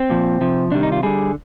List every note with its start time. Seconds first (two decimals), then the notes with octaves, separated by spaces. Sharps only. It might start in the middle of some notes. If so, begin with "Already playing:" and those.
Already playing: C4
0.10 A#2 F3
0.41 C3 F3
0.71 C3 D#3 G3 D4
0.83 D#4
0.92 F4
1.03 D3 G3 G#4